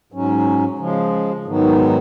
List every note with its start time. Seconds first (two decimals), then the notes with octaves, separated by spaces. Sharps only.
0.12 G#2 F#3 C#4
0.78 C#3 F3 G#3
1.44 G#2 D#3 F#3 B3